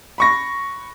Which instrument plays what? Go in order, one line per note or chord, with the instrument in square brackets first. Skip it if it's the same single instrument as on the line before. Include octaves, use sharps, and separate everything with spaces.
[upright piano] B5 C#6 A#6